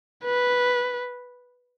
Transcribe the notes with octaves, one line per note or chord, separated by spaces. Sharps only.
B4